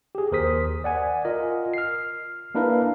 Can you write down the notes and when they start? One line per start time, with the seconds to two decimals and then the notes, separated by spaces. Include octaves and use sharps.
0.15 G4 G#4
0.32 D#2 A#4 C5 D#6 B6
0.84 D5 F#5 G#5
1.25 F4 A#4 D#5
1.74 F6 C7
2.55 A#3 D4 E4 A#4 B4 F5